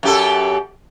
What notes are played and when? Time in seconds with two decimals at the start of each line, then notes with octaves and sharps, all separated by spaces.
0.03 F#2 G4 A4